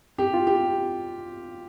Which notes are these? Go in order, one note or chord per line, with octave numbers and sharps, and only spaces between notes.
G4
F4
G4